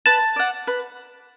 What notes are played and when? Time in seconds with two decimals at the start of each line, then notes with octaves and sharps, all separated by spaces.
0.06 B4 A5
0.36 D5 F#5
0.67 B4